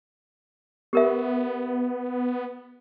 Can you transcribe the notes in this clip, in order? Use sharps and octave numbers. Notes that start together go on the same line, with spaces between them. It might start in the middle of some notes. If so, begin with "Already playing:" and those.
B3 G4 A#4 E5